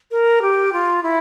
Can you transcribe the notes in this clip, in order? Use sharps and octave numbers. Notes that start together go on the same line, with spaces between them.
A#4
G4
F4
E4